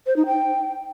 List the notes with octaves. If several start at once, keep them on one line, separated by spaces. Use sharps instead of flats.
C5
D#4
G5